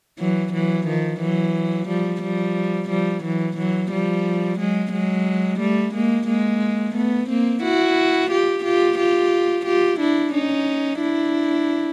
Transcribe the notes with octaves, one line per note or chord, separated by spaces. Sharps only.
E3 F#3
E3 F#3
D#3 F3
E3 F#3
F3 G3
F3 G3
F3 G3
E3 F#3
E3 F#3
F3 G3
F#3 G#3
F#3 G#3
G3 A3
G#3 A#3
G#3 A#3
A3 B3
A#3 C4
E4 F#4
F4 G4
F4 G4
F4 G4
F4 G4
D4 E4
C#4 D#4
D4 E4